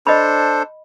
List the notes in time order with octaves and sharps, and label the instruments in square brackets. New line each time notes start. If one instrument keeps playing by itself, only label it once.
[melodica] D4 A4 C5 [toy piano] D#5 B5